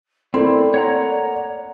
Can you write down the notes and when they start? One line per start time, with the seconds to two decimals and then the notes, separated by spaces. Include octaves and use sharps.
0.34 A3 A#3 C4 E4 D5
0.74 C#5 F#5 A#5